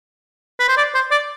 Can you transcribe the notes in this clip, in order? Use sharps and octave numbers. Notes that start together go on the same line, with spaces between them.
B4
C5
D5
C5
D5